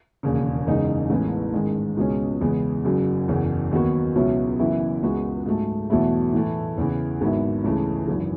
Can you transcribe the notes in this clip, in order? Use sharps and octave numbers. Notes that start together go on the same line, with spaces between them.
E1 D#2 C#3
F#1 E2 C#3 G#3 D#4
A1 A2 G#3 B3
G#2 D#3 G#3
C#2 B2 G#3 C#4
E2 C#3 E3 G#3 B3
F#1 F#2 C#3 F#3
F#1 E2 C#3
D#2 D#3 F#3 B3 F#4
C#2 B2 F#3 C#4 E4
F#1 F#2 E3 B3 E4
C#2 C#3 G#3 B3 F#4
G#2 F#3 A3
E2 B2 F#3 A3 E4
A2 E3 A3
E2 C#3 E3
G#1 G#2 F#3 B3 E4
C#2 C#3 E3 A3
G#1 F#2 E3